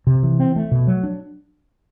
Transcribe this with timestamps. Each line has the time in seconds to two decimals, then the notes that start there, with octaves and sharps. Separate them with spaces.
0.07 C3
0.23 E3
0.40 C4
0.56 A3
0.71 B2
0.87 F#3
1.04 D4